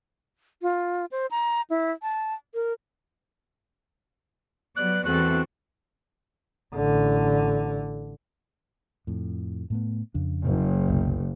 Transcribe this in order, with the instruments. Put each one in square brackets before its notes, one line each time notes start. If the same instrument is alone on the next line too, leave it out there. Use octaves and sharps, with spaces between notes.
[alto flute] F4
C5
A#5
E4
A5
A#4
[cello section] F#3 G3 B3 [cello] D5 [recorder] F#6
[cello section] E2 A4 [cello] C4 F#4 [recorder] F#6
[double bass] A1 D3
[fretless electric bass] F2 A2
A2 A3 B3
F2 C#3 D4
[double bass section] F#1
[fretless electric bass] C2 F#2 B2